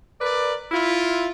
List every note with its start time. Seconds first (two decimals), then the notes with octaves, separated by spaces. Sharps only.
0.21 A#4 B4 D5
0.72 E4 F4